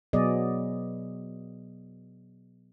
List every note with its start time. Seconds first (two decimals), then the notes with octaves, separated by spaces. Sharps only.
0.13 B2 F#3 B3 G#4 D5 D#5